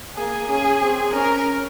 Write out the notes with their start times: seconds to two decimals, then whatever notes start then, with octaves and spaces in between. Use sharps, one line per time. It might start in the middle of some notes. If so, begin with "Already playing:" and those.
0.16 A#3 G#4
0.48 C#4 G#4
0.80 C4 G#4
1.13 C#4 A#4